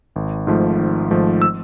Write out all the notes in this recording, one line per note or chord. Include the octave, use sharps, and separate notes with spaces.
G#1
G#2 F3 A3
G#1
G#2 F3 A3
E6